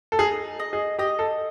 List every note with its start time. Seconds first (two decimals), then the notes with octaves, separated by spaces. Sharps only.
0.12 A4
0.19 D#4 G#4
0.60 D#5
0.73 G#4
0.99 G4 D#5
1.19 A4